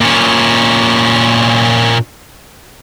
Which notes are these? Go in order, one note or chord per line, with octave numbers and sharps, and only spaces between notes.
A#2 C#4